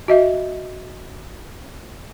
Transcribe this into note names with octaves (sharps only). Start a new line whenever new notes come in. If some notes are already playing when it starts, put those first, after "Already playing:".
F#4 D#5 E5